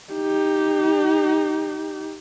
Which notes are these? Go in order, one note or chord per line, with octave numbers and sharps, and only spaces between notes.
D#4 G4